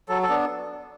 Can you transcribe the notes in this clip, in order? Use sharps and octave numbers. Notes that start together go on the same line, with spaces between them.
F#3 A4
A4
B3 D4